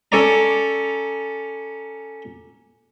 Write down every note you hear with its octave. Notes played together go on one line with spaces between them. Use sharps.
C#4 A4 C#5 D5 A#5